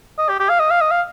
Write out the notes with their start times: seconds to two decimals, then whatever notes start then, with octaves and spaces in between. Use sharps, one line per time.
0.18 D#5
0.29 G4
0.40 G4
0.49 F5
0.60 D#5
0.71 F5
0.81 D#5
0.91 F5